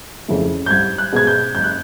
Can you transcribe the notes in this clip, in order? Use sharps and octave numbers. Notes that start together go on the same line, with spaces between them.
F2 C#3 E3 A3
G6
C2 G#6
F#6
B2 G#3 B3 G#6
G6
F#1 G6
F#6